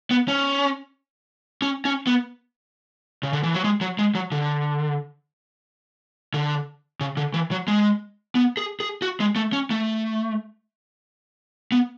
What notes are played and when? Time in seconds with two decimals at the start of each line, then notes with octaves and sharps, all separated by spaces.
0.11 B3
0.28 C#4
1.62 C#4
1.85 C#4
2.07 B3
3.23 C#3
3.33 D3
3.43 E3
3.54 F#3
3.64 G#3
3.81 F#3
3.99 G#3
4.15 F#3
4.32 D3
6.34 D3
7.01 C#3
7.17 D3
7.34 E3
7.51 F#3
7.68 G#3
8.35 B3
8.57 G#4
8.80 G#4
9.02 F#4
9.20 G#3
9.36 A3
9.53 C#4
9.70 A3
11.72 B3